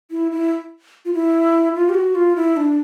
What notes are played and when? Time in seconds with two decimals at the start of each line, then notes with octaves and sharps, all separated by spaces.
0.11 E4
0.32 E4
1.05 F4
1.14 E4
1.75 F4
1.89 G4
1.94 F#4
2.15 F4
2.36 E4
2.57 D4